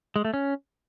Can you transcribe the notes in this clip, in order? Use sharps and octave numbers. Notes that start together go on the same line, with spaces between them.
G#3
A3
C#4